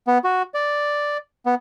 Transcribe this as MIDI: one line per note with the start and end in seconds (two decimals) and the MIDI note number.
0.07 0.18 59
0.24 0.42 66
0.54 1.17 74
1.46 1.55 59